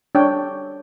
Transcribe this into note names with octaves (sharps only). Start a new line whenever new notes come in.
D4 C#5 G5